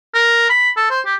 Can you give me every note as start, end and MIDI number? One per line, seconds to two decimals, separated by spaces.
0.14 0.47 70
0.50 0.70 83
0.77 0.88 69
0.90 1.01 72
1.06 1.15 67